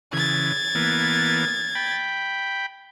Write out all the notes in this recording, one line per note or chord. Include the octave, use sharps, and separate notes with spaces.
C#3 E3 G#6 A6
E3 A#3 B3
G5 B5